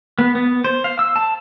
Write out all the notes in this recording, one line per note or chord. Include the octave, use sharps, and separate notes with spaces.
B3
B3
C5
F5
E6
A5